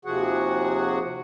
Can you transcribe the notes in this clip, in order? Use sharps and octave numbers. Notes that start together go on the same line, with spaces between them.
D#2 C3 F3 F#4 G#4 F#5